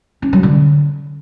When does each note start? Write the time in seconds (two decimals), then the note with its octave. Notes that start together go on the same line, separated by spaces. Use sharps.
0.22 C#4
0.33 F#3
0.43 D3